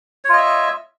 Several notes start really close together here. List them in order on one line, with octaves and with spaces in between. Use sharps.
C#5 F4 D#5 E5